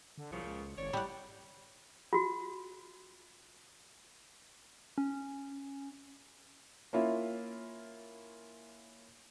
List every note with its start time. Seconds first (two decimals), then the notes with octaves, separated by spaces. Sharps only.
0.18 D3
0.31 C2 A#2 C#3 F3
0.44 C#2
0.77 G#1 C#5 D5
0.93 A2 G3 F#5
2.13 F4 F#4
4.98 C#4
6.93 A#3 C#4 E4 F4